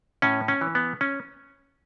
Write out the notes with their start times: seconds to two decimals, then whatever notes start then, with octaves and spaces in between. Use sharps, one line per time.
0.22 A2 C#4
0.48 C#4
0.61 E3
0.75 B3
1.01 C#4